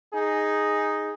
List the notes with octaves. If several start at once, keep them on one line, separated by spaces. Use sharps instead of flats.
D#4 G#4